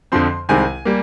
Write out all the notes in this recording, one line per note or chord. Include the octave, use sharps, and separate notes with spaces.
F2 D3 F3 C4 C6
C2 C3 D#3 G#3 C4 G#5
G3 A#3